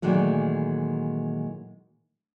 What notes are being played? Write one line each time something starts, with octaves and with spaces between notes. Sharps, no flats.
A#2 D#3 E3 F#3 G#3 A3